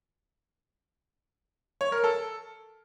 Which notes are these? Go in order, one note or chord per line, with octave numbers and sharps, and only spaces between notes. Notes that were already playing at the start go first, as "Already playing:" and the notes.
C#5
A#4
A4